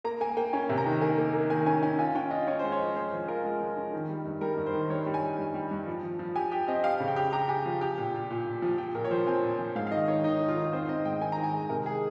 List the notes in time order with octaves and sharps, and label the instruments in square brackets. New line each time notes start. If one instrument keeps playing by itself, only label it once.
[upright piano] A#3 [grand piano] A#5
[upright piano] A#3 [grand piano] G#5
[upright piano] A#3 [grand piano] G5
[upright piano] C#4 [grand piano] G#5
[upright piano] C3
[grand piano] A#5
[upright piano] D#3
[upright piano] A#3 [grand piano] G#5
[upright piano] A#3
A#3
[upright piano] D#3 [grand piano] G#5
[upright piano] C#4 [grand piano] G#5
[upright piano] C#4 [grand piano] G#5
[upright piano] F4 [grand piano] G#5
[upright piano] C#4 [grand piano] G5
[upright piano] F4 [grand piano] D#5
[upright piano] C#4 [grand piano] C#5
[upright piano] G#3 [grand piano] C5
[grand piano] C#5
[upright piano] F3
[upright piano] F3 [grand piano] C5
[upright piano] F3
[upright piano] F4 [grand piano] A#4
[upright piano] G#3
F3
C#4
D#3
G3
G2
[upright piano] G3 [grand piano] A#4
[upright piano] G2
[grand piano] C5
[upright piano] D#3
[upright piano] G3 [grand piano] C#5
[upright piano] G3
[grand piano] G#5
[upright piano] G3
G2
G3
G2
F3
F3
F3
[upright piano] G4 [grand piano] G#5
[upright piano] G4 [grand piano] G5
[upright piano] C4 [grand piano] D#5
[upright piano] G4 [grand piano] F5
[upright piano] C#3
[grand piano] G5
[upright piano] G4
[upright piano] G4 [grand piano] A#5
[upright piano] G4 [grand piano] G#5
[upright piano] F3
G4
A#2
A#2
A#2
A#2
F3
[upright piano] F3 [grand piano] G5
[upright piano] A#2 [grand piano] A#4
[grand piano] C#5
[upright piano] F3 [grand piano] C5
[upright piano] C4 [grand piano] G#5
[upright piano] A#2
F3
[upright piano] G#2 [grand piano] F5
[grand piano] F5
[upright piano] D#3 [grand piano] D#5
[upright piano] D#3 [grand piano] C#5
[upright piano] D#3 [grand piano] D#4
[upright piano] D#3
[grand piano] F4
[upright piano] D#3
[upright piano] C4 [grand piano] C5
[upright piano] C4 [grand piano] D#5
[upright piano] G#2 [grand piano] G5
[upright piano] D#3 [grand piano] G#5
[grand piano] A#5
[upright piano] D#3
[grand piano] G#5
[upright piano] G#3
[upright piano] C3 [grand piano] A#4
[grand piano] G#4